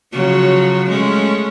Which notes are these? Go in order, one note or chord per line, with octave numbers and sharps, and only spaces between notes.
C#3 F3 F#3
G#3 A3 C#4